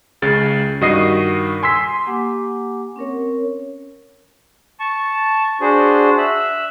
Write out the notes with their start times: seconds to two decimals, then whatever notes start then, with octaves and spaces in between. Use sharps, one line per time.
0.22 C#2 C#3 A6
0.81 G2 D#3 F#4 D#5 D#6 C7
1.63 G#5 C6 E6 B6
2.07 A#3 G4 F#5 G#5 D6
2.96 C4 C#4 A#4 C#5
4.80 A5 C#6
5.61 D4 F#4 G#4 C5
6.18 E5 E6 F#6